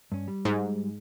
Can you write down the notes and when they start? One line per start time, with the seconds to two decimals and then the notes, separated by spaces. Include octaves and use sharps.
0.12 G2 C#4
0.28 G3
0.45 G#2